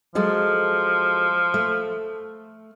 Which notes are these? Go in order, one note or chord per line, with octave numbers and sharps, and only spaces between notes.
F3 F#3 G#3 A4
A3